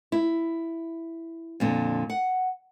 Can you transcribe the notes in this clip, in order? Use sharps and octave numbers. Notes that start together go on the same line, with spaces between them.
E4
F2 A#2 D3
F#5